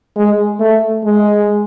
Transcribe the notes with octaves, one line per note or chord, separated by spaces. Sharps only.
G#3
A3
G#3